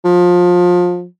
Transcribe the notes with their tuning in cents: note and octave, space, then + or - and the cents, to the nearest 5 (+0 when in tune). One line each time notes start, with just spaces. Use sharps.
F3 +25